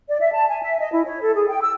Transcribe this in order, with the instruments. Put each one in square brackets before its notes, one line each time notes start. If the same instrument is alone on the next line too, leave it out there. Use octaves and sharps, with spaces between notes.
[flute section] D5
E5
A5
G#5
E5
D#5
E4
C#5
A4
G#4
G5
E6